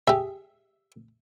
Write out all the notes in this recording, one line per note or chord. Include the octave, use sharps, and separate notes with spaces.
G4 G#4 E5